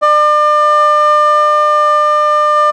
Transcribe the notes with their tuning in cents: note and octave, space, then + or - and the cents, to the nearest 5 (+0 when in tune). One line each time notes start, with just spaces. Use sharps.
D5 +35